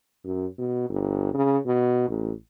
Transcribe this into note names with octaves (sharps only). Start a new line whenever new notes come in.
F#2
B2
G1
C#3
B2
A1